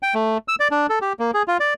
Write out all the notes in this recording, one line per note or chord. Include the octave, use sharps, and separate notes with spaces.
G5
A3
E6
D5
D4
A4
G4
A#3
G#4
F4
D5